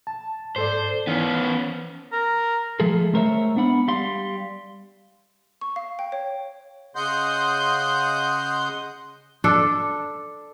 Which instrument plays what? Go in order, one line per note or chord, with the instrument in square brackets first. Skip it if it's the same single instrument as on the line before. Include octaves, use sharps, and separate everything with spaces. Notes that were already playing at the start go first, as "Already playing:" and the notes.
[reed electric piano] A5
[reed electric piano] G#2 A4 D5 [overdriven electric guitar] C5
[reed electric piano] E3 [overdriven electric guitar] B3 C#4
[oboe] A#4
[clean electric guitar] F3 G#3 A3 G#4 A4
G#3 A3 A#4 C5 C#5 E5
B3 D4 F#5 B5
G3 F5 C6
[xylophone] C#6
F5
G5
C#5
[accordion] C#3 D#5 F#5 C6 G6
[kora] D4 A4